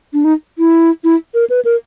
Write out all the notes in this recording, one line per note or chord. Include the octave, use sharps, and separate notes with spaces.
D4
D#4
E4
E4
A#4
B4
A#4